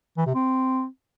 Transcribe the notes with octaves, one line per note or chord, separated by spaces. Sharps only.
E3
C3
C4